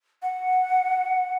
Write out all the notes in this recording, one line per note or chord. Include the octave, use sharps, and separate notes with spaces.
F#5